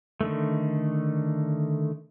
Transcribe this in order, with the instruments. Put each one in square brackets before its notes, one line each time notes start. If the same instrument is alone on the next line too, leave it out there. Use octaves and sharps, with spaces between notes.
[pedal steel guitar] D3 D#3 A3